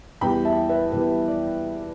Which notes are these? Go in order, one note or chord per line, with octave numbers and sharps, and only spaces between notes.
E2 E3 G3 G5 B5
E5 A5
B4 E5
E2 E3 G3 B4
D5